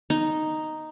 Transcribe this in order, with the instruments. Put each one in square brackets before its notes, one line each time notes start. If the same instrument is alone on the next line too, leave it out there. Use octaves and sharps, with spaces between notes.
[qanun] D#4